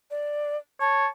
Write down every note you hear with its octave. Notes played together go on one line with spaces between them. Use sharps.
D5
C#5 A5